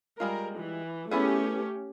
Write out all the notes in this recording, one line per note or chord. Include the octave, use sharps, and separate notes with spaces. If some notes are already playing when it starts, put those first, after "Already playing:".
G3 G#3 F4 A#4
E3
A3 B3 C#4 E4 G4 G#4